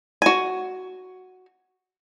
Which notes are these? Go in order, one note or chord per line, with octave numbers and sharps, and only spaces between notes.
F#4 G#5